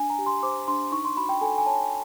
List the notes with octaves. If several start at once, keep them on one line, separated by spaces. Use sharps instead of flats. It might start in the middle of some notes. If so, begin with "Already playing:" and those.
Already playing: D4 G#5
A#5
G4
C6
C5 D6
D4 C6
D#4 C#6
C6
F#4 B5
G5
A4 G#5
G#5
C#5 A5